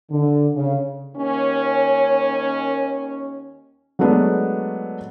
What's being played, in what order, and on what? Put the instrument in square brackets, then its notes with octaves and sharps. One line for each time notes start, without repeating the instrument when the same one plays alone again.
[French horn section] D3
C#3
D#2 C#4
[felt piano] F#3 G#3 A3 B3 D4